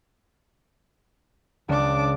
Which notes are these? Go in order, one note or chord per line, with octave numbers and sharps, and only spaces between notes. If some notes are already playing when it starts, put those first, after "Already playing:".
C#2 D4 D6